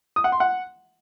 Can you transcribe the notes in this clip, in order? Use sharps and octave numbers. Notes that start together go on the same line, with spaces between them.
D#6
F#5
C6
F#5